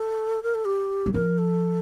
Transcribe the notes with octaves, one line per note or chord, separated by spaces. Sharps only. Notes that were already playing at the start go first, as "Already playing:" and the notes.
Already playing: A4
A#4
A4
G4
G3
F3 A#4
A4